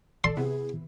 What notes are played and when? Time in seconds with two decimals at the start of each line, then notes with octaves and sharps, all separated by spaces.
0.24 A4 D5 C6
0.37 C3 B3 E4 G#4